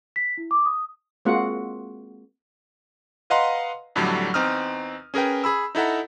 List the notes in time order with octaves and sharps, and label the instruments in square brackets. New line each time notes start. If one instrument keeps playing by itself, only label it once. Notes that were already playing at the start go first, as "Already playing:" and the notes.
[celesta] B6
E4
D6
D#6
[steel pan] G#3 A#3 C4 F4 F#4 F#5
[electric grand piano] B4 D#5 F5 F#5 A#5 C6
F2 A2 D3 F#3 G3
E2 C4 D#4 D#6 F6
C#4 G#4 A#4 B4 G5
G#4 B5 E6
D#4 E4 A4 F#5 A#5